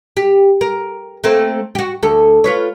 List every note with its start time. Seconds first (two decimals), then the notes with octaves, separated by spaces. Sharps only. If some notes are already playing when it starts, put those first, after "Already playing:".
0.17 G4
0.61 A#4
1.24 A3 A#3 C4
1.75 F#4 G4
2.03 D2 A4
2.44 F4 B4 C#5